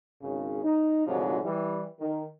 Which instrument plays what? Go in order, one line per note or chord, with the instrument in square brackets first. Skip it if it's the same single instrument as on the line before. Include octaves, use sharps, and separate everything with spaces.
[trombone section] G#1 C#3
D#4
D2 G#2 C3 D#3 F3 F#3
E3 G3
D#3